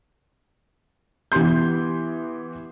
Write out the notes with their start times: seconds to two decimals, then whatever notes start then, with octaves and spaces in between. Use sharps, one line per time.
1.32 E3 B3 G4 C6 G6